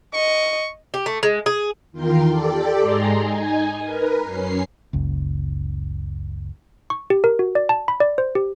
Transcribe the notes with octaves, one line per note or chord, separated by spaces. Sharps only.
D#5 C#6
G4
A3
G#3
G#4
E2 D#3 F4 A#4 G5 C6
G4 A4 D5
G#2 G#3 G#4 A#5 C6
D#4 G#5
A#4 B4
F#2 C#4 C7
F#1 C#2
C#6
G4
A#4
F#4
D5
A5
B5
D5
C5
G4